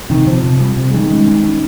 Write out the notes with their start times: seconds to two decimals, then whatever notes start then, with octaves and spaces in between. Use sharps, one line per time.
0.10 C3 D#3
0.26 C3 F3
0.43 C3
0.60 G3
0.77 C3
0.89 G#3
0.93 D#3 G3 C#4
1.11 G#3
1.27 C#4
1.44 C#4